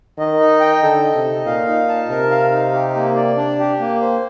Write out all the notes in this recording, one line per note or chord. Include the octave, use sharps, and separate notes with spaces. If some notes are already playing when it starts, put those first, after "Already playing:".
D#3 D#5
D#4
G5
D3 A4
D#5
C3
D#4
A#2 F5
D#4
A5
C3 A#4
F5
D#4
G4
A#3
D5
D4
G4
A#3
C5